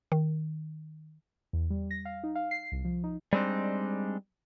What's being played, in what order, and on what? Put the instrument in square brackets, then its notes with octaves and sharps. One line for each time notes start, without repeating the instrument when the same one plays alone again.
[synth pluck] D#3
[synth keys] E2
G3
A#6
F5
D#4
F5
C7
C2
F3
D#4
[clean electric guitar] G3 G#3 C4 D4 D#4